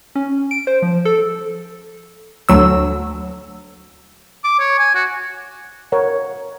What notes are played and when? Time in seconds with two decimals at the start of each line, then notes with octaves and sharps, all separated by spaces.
0.15 C#4
0.51 D7
0.67 C5
0.82 F3
1.05 A4
2.49 D2 F#3 E6
4.44 D6
4.59 C#5
4.79 G#5
4.95 F#4
5.92 A#4 C#5 F#5